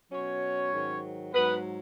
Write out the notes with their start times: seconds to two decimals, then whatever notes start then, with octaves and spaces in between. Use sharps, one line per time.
0.12 B2 F#3 C#4 C#5
0.73 G#2 D#3 F#3
1.33 G#2 F#3 B3 B4